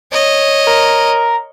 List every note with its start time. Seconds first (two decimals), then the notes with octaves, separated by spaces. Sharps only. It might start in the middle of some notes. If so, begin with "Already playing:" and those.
0.13 C#5 D#5
0.67 A#4